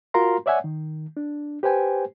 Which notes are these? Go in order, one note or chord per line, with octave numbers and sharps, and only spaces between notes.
F4 F#4 A#4 F5 A#5 C6
C#5 D5 E5 F#5 G#5
D#3
D4
G4 B4 C5 G5 G#5